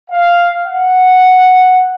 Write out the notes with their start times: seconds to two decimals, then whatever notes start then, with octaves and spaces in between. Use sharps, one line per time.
0.11 F5
0.66 F#5